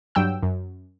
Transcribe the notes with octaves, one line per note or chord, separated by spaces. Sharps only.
G2 F#3 G5 E6
F#2